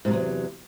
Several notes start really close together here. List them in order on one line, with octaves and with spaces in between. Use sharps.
G#2 C3 F#3 E2